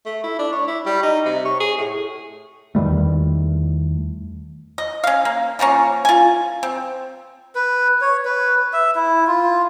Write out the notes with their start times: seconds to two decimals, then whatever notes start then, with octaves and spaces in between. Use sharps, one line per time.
0.06 A3
0.24 E4
0.39 D4
0.52 C#5
0.68 E4
0.86 G3
1.03 D#4
1.25 C3
1.45 C#5
1.60 G#4
1.78 A2
2.75 E2 D#3 G3 A3
4.78 D#5
5.04 C#4 F5
5.25 A#3
5.59 E3 F3 A#3 C#4
6.05 F4 G#5
6.63 C4
7.55 B4
8.01 C#5
8.25 B4
8.73 E5
8.95 E4
9.27 F4